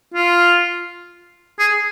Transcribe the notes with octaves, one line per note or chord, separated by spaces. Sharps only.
F4
G#4